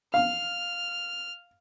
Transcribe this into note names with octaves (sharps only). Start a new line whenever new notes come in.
F5 F6